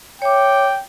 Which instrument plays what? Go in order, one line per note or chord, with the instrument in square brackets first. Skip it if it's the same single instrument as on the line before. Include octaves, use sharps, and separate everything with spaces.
[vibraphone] C#5 E5 D6 [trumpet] G5